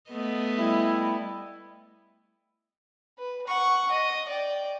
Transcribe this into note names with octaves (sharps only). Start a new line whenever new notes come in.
A3 B3 D#5
G3 E4
B4
F#5 C#6
D#5
D5 G5